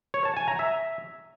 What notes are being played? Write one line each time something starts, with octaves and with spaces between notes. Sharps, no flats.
C#5
A5
G#5
A#5
E5